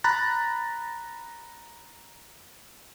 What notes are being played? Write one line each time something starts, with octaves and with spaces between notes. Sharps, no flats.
A#5 B5 F#6 A6